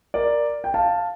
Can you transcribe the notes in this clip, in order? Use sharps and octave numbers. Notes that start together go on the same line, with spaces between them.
A#4 D5
G5
F5 A5